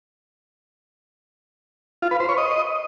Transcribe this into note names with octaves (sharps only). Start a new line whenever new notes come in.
F4
B4
C5
C#5
D#5